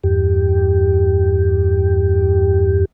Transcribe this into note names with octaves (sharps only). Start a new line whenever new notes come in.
E2 G2 G4